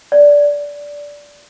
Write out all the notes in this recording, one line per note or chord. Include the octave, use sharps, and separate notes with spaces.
D5